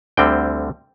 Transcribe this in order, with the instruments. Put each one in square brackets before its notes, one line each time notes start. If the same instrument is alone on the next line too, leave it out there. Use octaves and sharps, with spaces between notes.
[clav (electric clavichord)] D2 D3 G3 C4 G5